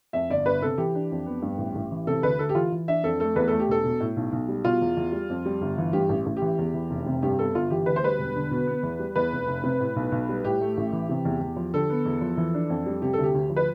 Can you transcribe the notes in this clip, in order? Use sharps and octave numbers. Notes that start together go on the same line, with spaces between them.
F2 E5
G1 D5
G1 B4
C3 A4
E3 G4
D4
F2
B3
G2
A1
A1
E3
C3 A4
D2 B4
D2 A4
G4
E3 F4
E3
D4 E5
F2 A4
A3 A4
E2 B4
A3 A4
G4
E1 A4
B2
A2
B1
B1
G3
B2 F4
E2
E2
G3
F2
G3
G1
E3
G2 G4
A1
A1
G4
E3
E2
E3
F1
C3
G2 G4
B3 A4
G1 F4
E3 G4
D2 B4
C5
G3 B4
E1
D3
B2
B3
E2
G3
E2 B4
F1
F1
C3
A2
B1
B1
G3
A2 G4
A3
A1
E3
C3
E2
E2
F3
D3 A4
B3
E2
F3
E3
D4
F2
G3
C3 G4
D2 A4
G4
D2
F3
B4